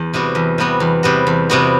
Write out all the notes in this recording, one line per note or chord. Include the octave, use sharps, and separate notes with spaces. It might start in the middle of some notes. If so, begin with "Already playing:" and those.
Already playing: E2
C3 G3 B3 F#4
E2
C3 G3 B3 F#4
E2
C3 G3 B3 F#4
E2
C3 G3 B3 F#4